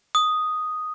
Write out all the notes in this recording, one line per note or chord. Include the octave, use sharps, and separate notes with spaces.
D#6